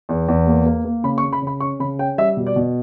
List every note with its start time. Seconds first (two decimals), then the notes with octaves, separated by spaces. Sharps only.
0.09 E2
0.28 E2
0.47 A#3
0.66 A#3
0.85 A#3
1.04 C#3 B5
1.18 C#6
1.23 C#3
1.33 B5
1.42 C#3
1.47 B5
1.60 C#4 C#6
1.80 C#3 B5
1.99 C#4 G5
2.18 G3 E5
2.37 B2
2.47 D5
2.56 B2